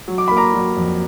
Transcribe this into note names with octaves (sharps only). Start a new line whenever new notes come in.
F#3
D6
A#3 B5
A#5 D6
F#3
F2